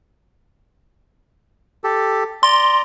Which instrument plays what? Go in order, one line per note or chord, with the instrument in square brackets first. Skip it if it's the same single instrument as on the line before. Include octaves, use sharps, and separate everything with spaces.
[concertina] G4 A4
[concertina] D5 A#5 [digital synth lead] C6